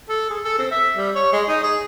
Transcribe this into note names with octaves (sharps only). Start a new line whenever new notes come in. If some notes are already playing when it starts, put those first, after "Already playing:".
A4
G#4
A4
C4
E5
G3
C#5
G#3
D#4
G#4